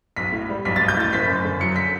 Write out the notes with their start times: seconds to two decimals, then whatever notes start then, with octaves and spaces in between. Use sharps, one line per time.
0.16 B1 B6
0.32 A2
0.49 G3
0.65 B1 B6
0.76 B1 A6
0.88 G6
0.97 A2 A6
1.12 F#1 B6
1.28 F#2
1.45 D3
1.60 F#3 C#7
1.76 B6